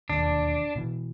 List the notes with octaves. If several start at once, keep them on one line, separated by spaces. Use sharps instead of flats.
E1 D#2 D3 D4
B2 E3